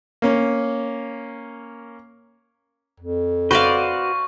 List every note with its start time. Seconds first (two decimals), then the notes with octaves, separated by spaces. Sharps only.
0.22 A#3 C#4
3.00 F2
3.51 F#4 B4 C5 D5 F5 C#6